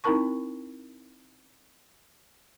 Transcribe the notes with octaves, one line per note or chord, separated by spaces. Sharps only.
C4 D#4 E4 A#4 A5 C#6